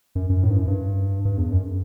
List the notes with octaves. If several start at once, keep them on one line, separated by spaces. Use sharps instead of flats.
F#2
F#2
A2
G2
F#2
G2
G2
E2
F#2